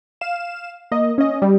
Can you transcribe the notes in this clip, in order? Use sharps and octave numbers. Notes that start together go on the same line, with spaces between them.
F5 E7
A#3 D#5
C#4 D#5
G3